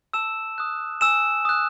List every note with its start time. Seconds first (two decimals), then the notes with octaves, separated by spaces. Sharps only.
0.13 A5 E6 E7
0.58 D#6 F#6
1.01 G#5 E6 E7
1.45 D#6 F#6